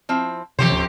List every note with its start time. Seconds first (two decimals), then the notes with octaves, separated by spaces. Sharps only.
0.09 F3 C4 E4
0.59 F2 C3 E3 G4 C5 C#5
0.72 D1 C#4